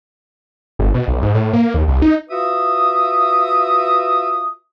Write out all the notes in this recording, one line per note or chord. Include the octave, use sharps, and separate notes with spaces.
G1
B2
B1
G#2
A2
A#3
D#2
C2
D#4
F4 F#4 B4 E5 D#6